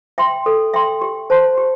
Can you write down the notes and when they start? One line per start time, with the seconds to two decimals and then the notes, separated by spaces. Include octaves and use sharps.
0.18 E5 G5 C6
0.46 A4
0.74 E5 G5 C6
1.02 G4
1.30 C5 A5 C6
1.58 G4